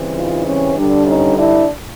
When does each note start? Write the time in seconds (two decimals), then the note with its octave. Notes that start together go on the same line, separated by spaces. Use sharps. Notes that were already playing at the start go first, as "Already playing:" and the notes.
Already playing: C#3 E3 G3 C4
0.14 D#4 F4
0.45 C#4
0.76 G2 D3 G3 D4
1.06 C#4 D#4
1.37 D4 E4